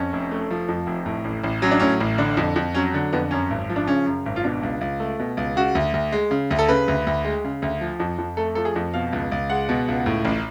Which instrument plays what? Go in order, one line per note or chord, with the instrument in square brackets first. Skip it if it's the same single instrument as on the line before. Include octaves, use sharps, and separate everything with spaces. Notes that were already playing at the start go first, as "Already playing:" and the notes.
Already playing: [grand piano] F2 C#4
F1
A3
F3
F2
F1
A2
A1
A1
F#3 C#4
D4
A2 C#4
A1
D3 D4
F2
F2
F#3 C#4
D3
F2 B3
F#2 C#4
G#1
F3
D4
C#3 C#4
F#2
G#1
F4
B2 D4
C#2
C#2
A3
B2
C#2
C#3 F#4
D2
D2
G#3
C#3
D2
A4
C#3 B4
D2
D2
G#3
C#3
D2
F3
F2
F2
A3 A4
F3 A4
G#4
F2
B2 F5
C#2
C#2
G#3 F#5
B2
C#2
A2
A1